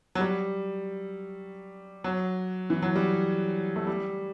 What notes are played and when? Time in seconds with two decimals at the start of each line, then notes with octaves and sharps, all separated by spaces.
0.15 F#3
0.20 G3
2.04 F#3
2.70 E3
2.82 F#3
2.95 G3
3.76 A3
3.87 G3